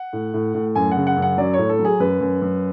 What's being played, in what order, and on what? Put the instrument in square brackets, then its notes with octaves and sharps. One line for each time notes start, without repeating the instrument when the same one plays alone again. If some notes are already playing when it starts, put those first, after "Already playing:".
Already playing: [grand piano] F#5
A2
A2
A2
F#2 G#5
F#5
C#3
F#5
F#2
F#5
F#3 D5
A2 C#5
A4
F#3
G#4
F#2 B4
F#2
F#2